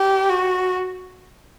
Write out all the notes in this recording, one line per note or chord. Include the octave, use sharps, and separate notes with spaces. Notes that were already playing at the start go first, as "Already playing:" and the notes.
Already playing: G4
F#4